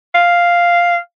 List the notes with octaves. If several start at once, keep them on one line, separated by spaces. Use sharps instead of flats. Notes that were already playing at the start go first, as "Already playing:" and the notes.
F5